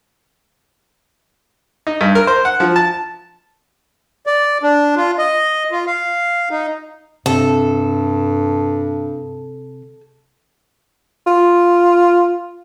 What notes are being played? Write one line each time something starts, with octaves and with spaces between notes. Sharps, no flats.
D#4
G2
A#4
C5
F#5
F3
A5
D5
D4
F4
D#5
F4
F5
D#4
G2 C3 C4 A4
F4